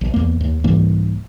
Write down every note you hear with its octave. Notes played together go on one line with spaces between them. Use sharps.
A#1
E2 A#3
D#2
C2 G#2 E3 A#3